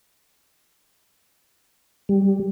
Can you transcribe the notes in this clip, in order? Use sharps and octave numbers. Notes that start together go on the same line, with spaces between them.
G3